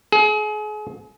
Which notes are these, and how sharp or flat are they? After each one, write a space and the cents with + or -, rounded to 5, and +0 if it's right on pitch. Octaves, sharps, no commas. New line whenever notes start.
G#4 +35